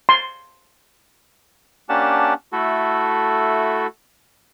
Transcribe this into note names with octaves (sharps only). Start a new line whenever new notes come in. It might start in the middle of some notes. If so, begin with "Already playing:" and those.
C6
A#3 C#4 D4 G4 F#5 A5
A3 E4 F#4 A4